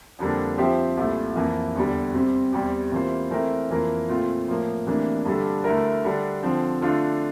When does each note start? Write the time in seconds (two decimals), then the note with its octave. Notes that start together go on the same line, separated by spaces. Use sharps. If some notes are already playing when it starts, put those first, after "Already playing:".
0.19 F2 D3 G3 A#3 D4
0.58 F3 C4 G4 C5 E5
0.97 C2 A#2 A3 E4
1.36 F2 E3 A#3
1.75 E2 D3 G3
2.14 C3 G3 C4
2.53 E2 C3 G3 C4 G4
2.91 C3 E3 A#3 F4 C5
3.31 E3 A3 C4 E4 A#4
3.70 F2 E3 A#3 F4 A#4
4.08 A#2 A3 C4 F4
4.48 A2 F3 A#3
4.87 D2 C3 E3 A#3 D4
5.25 G2 D3 G3 D4 A4
5.64 D2 D3 A3 E4 A#4
6.04 D3 G3 D4
6.43 D3 F3 C4
6.81 D3 A3 D4 F4 A4